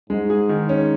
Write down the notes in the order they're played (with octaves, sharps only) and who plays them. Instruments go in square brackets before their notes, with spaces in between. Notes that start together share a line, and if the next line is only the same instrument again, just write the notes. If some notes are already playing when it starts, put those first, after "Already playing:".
[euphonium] G#2 [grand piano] G#3
[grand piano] G#4
D#3
C#4